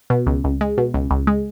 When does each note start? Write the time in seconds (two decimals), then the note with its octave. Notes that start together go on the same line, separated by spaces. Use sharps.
0.10 B2
0.27 C#2
0.44 C#2
0.61 G#3
0.78 B2
0.94 C#2
1.11 C#2
1.27 G#3